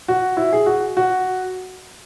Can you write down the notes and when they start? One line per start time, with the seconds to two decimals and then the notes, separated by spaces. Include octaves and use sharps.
0.08 F#4
0.37 E4
0.53 G#4
0.66 F#4
0.97 F#4